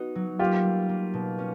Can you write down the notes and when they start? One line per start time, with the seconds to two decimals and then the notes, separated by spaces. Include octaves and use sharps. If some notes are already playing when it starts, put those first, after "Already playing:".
Already playing: B3 D#4 F#4
0.15 F#3
0.39 A#3 F4 G4
0.64 G3
0.89 A#3
1.14 B2
1.39 C#4